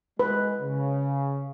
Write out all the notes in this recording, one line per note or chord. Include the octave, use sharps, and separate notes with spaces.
G#3 B4
C#3